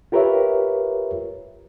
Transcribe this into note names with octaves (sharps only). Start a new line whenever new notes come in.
F4 G4 A#4 B4 C#5 E5